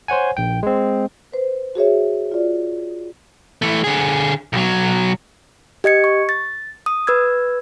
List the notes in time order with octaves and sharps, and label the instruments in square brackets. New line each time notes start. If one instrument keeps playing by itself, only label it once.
[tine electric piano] C5 C#5 F#5 G#5
A#1 G5
G#3 C4
[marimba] B4 C5
F#4 G#4 C#5 E5
F4 D5
[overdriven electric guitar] E3 A3
D3 G#4
B1 F#3
[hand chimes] G4 D#5 G#6 C#7
C#6
A6
D#6
B4 E6 G#6